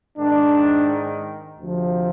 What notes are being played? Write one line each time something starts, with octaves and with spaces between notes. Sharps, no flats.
G#2 D#3 D4
D2 C3 F3